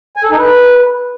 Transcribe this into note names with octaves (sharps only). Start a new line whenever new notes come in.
G#5
A4
D#4
B4